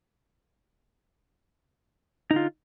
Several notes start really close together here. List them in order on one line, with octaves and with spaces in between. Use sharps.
D#4 D3 F4